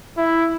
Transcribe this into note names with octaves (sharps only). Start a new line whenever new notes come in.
E4